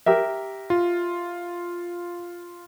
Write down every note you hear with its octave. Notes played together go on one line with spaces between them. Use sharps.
G4 A#4 E5
F4